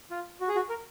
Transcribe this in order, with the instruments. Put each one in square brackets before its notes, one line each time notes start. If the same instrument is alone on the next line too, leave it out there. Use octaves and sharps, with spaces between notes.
[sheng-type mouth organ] F4
F#4
G#4
F#4
A#4